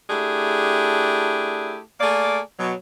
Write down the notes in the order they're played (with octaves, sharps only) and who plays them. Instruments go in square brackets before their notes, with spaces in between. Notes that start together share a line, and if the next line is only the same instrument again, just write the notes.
[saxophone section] A3 D4 E4 G4 G#4
A3 A#3 G#4 D5
B2 F#3